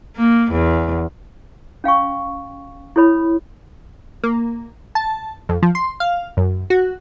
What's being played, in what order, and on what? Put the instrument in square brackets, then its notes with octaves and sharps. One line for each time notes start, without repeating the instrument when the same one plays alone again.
[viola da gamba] A#3
E2
[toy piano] C#4 F5 G5 C#6
E4 A4 C#5 B5
[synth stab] A#3
A5
F2
F3
C6
F5
F#2
F#4